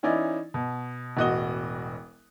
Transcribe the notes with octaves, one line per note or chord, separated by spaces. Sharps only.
E3 C#4 D#4 E4 D5
B2
E1 A1 F#4 D#5 D#6 G7